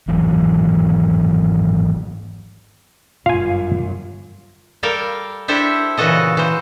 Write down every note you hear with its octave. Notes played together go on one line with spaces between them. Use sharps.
G#1 E3 F#3
G1 F#2 F4 F5 G#5
G3 A4 A#4 F5 G5
D4 E4 G4 A4 C5 E5
A#2 C#3 E3 F#4 A4 D#5
E3 C5